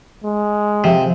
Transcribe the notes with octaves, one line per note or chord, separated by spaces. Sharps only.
G#3
C3 F3